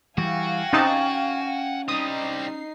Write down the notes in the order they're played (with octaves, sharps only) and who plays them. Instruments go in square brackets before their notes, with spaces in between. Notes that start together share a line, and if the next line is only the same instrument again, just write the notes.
[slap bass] E3 G3 [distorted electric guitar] F#4 [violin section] F5 G5 G#5
[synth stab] C3 D#4 A5 [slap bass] C#4
[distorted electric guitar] G3 C4 [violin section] D#4 C7 [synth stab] D#6